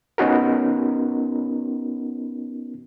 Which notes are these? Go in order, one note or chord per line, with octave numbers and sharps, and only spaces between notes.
B3 C#4 D#4 F#4 A#4